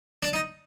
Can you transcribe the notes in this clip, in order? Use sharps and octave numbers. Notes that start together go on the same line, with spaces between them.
D4
D#4